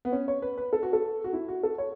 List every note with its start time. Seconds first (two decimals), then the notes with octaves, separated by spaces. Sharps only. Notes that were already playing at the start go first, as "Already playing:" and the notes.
0.05 B3
0.12 C#4
0.28 C#5
0.42 B4
0.58 B4
0.73 A4
0.83 F#4
0.93 A4
1.24 F#4
1.33 E4
1.48 F#4
1.63 A4
1.78 C#5